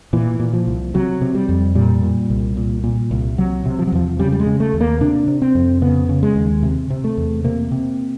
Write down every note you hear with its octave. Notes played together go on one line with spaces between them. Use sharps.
A#2 E3
A#2
F3
C2
C3 F#3
C3
G3
F2
A#2 G3
A#2
C2
A#2
A#2
C2
C3 F#3
C3
F3
F#3
E2 F3
C#3 G3
G3
G#3
C#3
A3
D#2
A#3
C3 D4
C3
C4
F2
C#3 B3
C#3
G#3
D#2
C3
C3
A3
E2
C3 A#3
C3